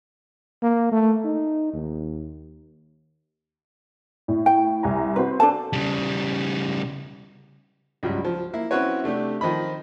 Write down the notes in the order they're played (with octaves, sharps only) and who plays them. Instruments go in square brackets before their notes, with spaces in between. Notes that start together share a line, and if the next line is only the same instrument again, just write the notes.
[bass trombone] A#3
A3
D#4
D#2
[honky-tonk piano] A2
[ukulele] G5
[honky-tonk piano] C2 G#5 A#5
[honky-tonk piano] C4 F#4 C5 [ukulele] B4
[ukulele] D4 A4 A5
[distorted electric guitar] C#3 G3
[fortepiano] C#2 G2 F#3 G3
F3
A#3 E4
C4 C#4 E4 F#4 B4 C#5
C3 A3 D4 G4
D#3 F3 D#5 B5